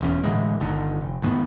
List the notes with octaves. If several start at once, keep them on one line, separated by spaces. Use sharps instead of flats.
E1 E2 C#4
A2 D3 E3 G#3
G1 D3 D#3
F1
D2 G#2 D#3 B3